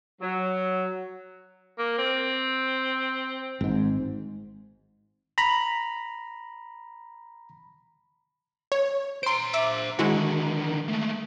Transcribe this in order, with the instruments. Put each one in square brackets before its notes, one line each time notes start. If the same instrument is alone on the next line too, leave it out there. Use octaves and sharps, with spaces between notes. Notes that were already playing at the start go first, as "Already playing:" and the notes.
[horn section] F#3
[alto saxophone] A#3
C4
[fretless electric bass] G#1 G#2
[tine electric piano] A#5 B5
[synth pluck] C#5
[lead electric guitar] C5 A#5 [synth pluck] C6 D7
[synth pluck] E5 D6
[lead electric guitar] D3 D#3 [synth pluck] G#3 E4 F#4
[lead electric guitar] G#3 A3